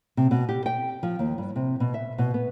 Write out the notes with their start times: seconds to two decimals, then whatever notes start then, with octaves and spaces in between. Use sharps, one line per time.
0.17 C3
0.31 B2
0.49 G4
0.66 G5
1.03 F3
1.19 D#2
1.38 G2
1.56 C3
1.80 B2
1.94 E5
2.18 B2
2.34 B3